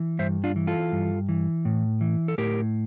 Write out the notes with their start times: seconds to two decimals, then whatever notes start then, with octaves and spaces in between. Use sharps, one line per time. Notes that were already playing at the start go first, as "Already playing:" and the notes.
Already playing: E3
0.19 G2 C5 E5
0.44 D4 F4
0.56 E3
0.67 F4 A4
0.92 G2
1.29 E3
1.65 A2
2.01 E3
2.28 A4
2.38 A2 G4 A#4